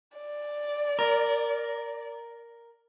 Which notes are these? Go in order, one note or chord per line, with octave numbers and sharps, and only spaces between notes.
D5
A#4